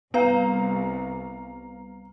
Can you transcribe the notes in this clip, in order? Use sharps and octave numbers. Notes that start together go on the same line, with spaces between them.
C2 B3 B4 F5 A#5